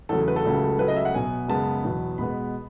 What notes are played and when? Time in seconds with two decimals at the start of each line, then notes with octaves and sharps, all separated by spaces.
0.09 E2 C#3 F#3 A3 A4
0.28 B4
0.36 A4
0.45 C#2 C#3 F#3 A3
0.79 C#2 C#3 F#3 A3 B4
0.88 D#5
0.96 E5
1.05 F#5
1.14 B2 F#3 B3 G#5
1.48 F#2 C#3 G#3 B3 A5
1.84 E2 B2 F#3 B3
2.18 B2 G#3 B3 B5